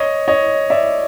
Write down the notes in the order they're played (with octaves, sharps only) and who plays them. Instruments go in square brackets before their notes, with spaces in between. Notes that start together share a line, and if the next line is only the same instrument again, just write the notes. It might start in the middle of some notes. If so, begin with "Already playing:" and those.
Already playing: [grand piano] C#5 D#5
C#5 D#5
D5 E5